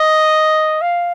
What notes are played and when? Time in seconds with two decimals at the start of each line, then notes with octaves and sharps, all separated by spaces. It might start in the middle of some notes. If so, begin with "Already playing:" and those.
Already playing: D#5
0.82 F5